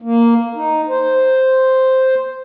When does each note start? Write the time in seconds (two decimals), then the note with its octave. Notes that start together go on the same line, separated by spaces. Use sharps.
0.02 A#3
0.56 D#4
0.89 C5